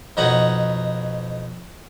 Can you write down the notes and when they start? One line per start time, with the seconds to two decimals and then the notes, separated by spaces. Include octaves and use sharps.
0.17 F2 B2 D#4 F#4 C#5 F#5